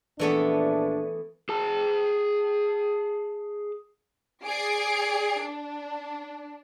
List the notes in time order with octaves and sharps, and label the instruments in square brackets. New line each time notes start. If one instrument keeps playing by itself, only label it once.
[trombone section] A#1 D4 [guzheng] E3 A3 B3
[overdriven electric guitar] G#4 A5
[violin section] G#4 D5 C7 D7
D4